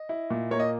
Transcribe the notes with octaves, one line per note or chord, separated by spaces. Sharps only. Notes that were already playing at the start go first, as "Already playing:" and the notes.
Already playing: D#5
E4
A#2
A#3 C#5
D#5